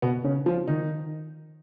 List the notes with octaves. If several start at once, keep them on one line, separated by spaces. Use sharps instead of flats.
B2 B3
C#3 C#4
F3 F4
D#3 D#4